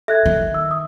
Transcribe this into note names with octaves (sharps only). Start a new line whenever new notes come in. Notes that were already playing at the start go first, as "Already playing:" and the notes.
A4 E5 F#6 G#6
D#3
E6
D#6